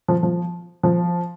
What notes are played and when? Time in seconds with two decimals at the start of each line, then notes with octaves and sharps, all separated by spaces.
0.08 F3
0.23 F3
0.83 F3